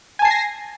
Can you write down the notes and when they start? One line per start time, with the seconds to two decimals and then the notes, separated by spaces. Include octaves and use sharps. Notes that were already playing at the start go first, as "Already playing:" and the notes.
0.19 G#5
0.22 A5
0.25 C7
0.28 G#6
0.31 A#6